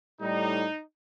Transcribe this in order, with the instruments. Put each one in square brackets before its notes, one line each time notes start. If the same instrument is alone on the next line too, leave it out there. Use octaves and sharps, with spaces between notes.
[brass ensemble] A2 G3 D#4